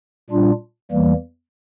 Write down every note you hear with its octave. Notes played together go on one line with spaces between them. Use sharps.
A#2 G3 D4 F4
E2 E3 G3 A#3